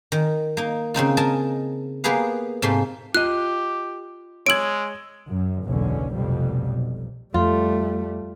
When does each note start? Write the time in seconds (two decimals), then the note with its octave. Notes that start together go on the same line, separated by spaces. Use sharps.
0.12 D#3
0.57 A#3 D#4
0.94 C#3 C4 D#4 F4
1.17 A#4 D#5 G#5 A5
2.04 A#3 B3 G4 G#4 B4 F5
2.62 G#2 C3 A3 F4 C6
3.15 F4 G4 D#5 F#6
4.46 G#3 C#5 E6 G#6 D7 F#7
5.30 F#2
5.66 F#1 B1 E2 D3 C#4
6.12 F1 F2 B2 G3
6.66 B1
7.34 F2 G3 A3 F4